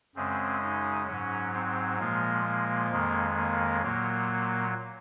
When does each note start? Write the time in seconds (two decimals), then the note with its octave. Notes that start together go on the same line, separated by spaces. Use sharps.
0.15 F#2 C#3 G#3 C4
0.62 D#4
1.07 G#2 F#3 C#4
1.54 C4
1.99 A#2 F3 G#3 A#3
2.45 A#3
2.91 F2 D#3 G#3
3.36 A#3
3.82 A#2 F#3 A#3